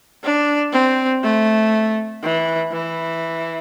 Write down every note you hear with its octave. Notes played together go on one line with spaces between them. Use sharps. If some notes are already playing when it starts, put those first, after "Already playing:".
D4
C4
A3
E3
E3